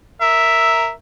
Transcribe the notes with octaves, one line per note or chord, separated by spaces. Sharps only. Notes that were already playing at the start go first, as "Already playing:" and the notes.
A#4 E5